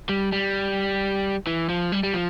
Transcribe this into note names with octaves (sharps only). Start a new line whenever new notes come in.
G3
G3
E3
F3
G3
G3
F3